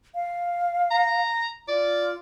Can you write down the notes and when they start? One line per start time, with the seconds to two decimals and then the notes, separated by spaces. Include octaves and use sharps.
0.15 F5
0.91 A#5
1.68 F4 D5